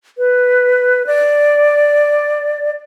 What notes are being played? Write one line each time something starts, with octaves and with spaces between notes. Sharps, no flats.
B4
D5